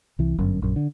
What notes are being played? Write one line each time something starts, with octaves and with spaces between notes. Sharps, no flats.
C2 E3
G1 F#2
A#1 F#2
D3